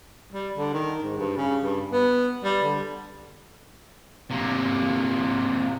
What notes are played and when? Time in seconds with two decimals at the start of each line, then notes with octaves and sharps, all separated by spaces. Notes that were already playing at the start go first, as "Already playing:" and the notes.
0.32 G3
0.57 D3
0.74 D#3
1.02 G#2
1.18 G2
1.37 C#3
1.61 G2
1.93 B3
2.44 G3
2.63 D3
4.31 C3 A#3